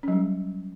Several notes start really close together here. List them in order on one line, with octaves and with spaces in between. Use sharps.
C#4 F#3 G3